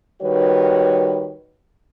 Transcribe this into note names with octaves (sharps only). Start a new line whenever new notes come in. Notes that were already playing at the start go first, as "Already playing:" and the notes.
D#3 G3 F#4 B4 C#5